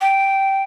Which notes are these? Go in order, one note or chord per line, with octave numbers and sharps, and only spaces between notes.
G5